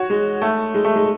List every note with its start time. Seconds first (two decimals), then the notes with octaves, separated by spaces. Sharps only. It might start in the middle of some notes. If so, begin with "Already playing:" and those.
Already playing: F#4 C#5
0.10 G#3
0.42 A3
0.74 G#3
0.85 A3
0.96 G#3